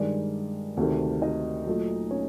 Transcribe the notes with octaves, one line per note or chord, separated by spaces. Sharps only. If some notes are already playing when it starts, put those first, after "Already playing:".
Already playing: G2 D#3 G#3 D4 D5
D2 C3 D#3
D#4 D#5
A#2 F#3 A3
C#4 C#5